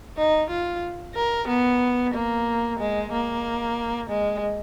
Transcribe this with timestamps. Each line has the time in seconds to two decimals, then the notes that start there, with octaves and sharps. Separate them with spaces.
0.17 D#4
0.50 F4
1.15 A#4
1.48 B3
2.14 A#3
2.79 G#3
3.12 A#3
4.10 G#3